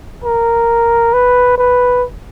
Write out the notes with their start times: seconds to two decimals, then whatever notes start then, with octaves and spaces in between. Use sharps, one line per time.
0.24 A#4
1.13 B4
1.58 B4